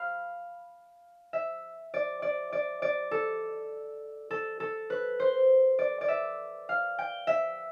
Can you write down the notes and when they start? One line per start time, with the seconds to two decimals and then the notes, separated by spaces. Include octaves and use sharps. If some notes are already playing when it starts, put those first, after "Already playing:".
Already playing: F5 B5
1.33 E5
1.94 D5
2.22 D5
2.53 D5
2.82 D5
3.11 A4
4.31 A4
4.60 A4
4.90 B4
5.20 C5
5.79 D5
6.01 D5
6.08 E5
6.69 F5
6.99 G5
7.27 E5